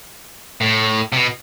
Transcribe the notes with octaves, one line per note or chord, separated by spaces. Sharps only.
A2
C3
B2